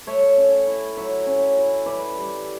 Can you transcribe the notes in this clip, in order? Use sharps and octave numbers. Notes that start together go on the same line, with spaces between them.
A3 C#5 E5
C#4
E4
F#3 C#5 E5
C#4
E4
E3 B4 D5
G3